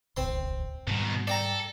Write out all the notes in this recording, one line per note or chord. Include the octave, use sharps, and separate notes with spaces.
D#1 G#1 C#2 C4 C6
G#2 B2 D#3 G3
A4 D5 G5 A#5